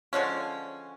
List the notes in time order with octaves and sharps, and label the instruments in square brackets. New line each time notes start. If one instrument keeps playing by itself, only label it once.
[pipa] D3 F3 G#3 C#4